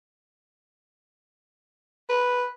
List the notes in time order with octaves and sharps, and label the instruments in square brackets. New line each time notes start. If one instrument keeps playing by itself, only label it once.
[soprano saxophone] B4